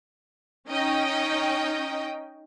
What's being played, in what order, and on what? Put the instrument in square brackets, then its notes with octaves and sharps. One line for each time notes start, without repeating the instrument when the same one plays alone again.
[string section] C#4 D#4 D#5 G5